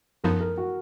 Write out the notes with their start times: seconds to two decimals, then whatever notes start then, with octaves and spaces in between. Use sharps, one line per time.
0.24 F#2 F3 B3 D#4 A#4
0.40 A#4
0.58 F#4